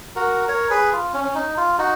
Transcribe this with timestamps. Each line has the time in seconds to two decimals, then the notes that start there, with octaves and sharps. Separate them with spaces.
0.16 F#4 A#4
0.48 A#4 C#5
0.70 G#4 B4
0.93 F4
1.13 C#4
1.24 C#4
1.35 D#4
1.57 F4
1.78 D#4 F#4